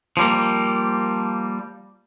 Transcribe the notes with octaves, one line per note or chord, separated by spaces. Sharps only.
F3 G3 A#3